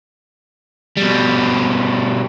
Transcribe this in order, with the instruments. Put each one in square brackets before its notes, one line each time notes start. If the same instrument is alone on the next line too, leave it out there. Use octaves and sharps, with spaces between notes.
[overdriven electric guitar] B2 G3